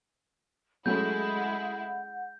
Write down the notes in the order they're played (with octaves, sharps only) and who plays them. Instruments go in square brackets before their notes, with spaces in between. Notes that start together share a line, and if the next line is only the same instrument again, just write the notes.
[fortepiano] F#3 A3 C#4 [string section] G#3 E4 [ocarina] F#5 [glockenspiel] G6